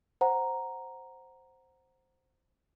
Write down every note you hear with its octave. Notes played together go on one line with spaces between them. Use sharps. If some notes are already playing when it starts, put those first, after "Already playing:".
C5 F#5 A#5